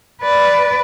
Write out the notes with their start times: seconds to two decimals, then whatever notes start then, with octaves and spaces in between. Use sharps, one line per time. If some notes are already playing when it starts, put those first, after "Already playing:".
0.22 B4 D5